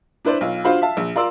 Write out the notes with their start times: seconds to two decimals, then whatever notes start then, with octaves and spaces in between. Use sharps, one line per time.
0.25 D4 E4 B4 C5 D5
0.41 B1 F4
0.64 D4 F4 F#4 C5 F5 B5
0.82 E5 F5 A5
0.97 A#1
1.16 F4 A#4 D5 C6 E6